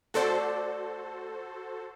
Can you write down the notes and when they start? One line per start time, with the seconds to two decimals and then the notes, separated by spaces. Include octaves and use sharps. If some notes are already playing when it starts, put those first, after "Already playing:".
0.14 A3 F#4 A4 C5 D5 A5